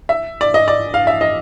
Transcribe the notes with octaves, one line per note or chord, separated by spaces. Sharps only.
E5
D5
D#5
D5
F5
E5
D#5